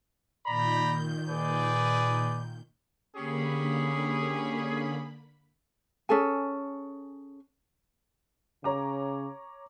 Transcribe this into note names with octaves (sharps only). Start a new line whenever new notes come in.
A#2 D#3 D5 A#5 B5 G6
G#4 B4 D5
D3 A#3 C#4 G4 G#4 B5
C#4 G#4 A4 G#5
C#3 C#5 A#5 D6